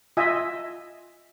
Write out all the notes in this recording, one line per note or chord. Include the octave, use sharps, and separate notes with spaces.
F4 D#5 E5 G#5